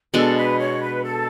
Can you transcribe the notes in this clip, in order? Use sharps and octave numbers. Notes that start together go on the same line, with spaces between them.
B2 G#3 D4 A4
B4
C#5
B4
A4